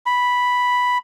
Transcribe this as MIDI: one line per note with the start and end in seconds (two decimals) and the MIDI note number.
0.06 0.98 83